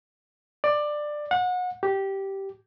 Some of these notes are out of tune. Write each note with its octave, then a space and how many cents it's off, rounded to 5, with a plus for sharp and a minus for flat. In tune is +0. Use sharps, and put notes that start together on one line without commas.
D5 +15
F#5 -30
G4 -10